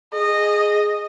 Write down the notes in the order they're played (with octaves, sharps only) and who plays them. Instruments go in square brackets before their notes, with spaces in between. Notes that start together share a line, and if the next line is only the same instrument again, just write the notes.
[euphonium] G#4 [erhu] D#5